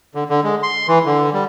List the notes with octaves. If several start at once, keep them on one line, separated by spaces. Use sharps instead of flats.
D3
D3
G#3
C6
E3
D3
G3